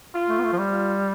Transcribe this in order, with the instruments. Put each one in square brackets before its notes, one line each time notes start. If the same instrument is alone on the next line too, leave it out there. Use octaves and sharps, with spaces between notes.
[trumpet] F4
[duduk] A3
B3
A3
F3
G3
[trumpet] F4